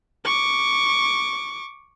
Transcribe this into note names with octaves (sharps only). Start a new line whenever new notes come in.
C#6 D6